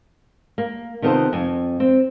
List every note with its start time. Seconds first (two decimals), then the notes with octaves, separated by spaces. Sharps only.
0.58 A#3
1.02 C3 D#3 B3 F4 A4 C5
1.33 F2 G#5
1.80 C4